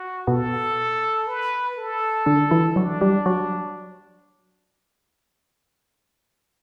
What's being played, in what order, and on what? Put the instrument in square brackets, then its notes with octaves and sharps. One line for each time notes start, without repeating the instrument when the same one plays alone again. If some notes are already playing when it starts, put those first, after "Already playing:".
Already playing: [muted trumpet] F#4
[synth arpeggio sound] B2 B3 [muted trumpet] A4
[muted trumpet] B4
A4
[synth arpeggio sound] D3 D4
E3 E4
[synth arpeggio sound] F#3 F#4 [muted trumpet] D4
[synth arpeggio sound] G3 G4
F#3 F#4